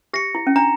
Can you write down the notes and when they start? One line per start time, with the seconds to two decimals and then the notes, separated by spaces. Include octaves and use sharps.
0.13 G4 A#6 C#7
0.35 E4
0.47 C#4
0.56 D4 A#5